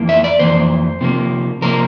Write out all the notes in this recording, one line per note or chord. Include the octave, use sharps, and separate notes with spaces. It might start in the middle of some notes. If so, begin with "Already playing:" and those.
Already playing: F2 E3 A#3
E5
D5
F2 E3 A#3 C5
C3 F3 A#3
C3 F3 A#3 A#4